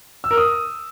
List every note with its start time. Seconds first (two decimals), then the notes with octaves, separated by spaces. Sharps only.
0.24 E6
0.31 A#4
0.38 D#6